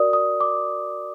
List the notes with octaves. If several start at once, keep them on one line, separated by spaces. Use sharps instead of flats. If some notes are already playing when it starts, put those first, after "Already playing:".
Already playing: F#4 A#4 D5 D#6
D#6
D6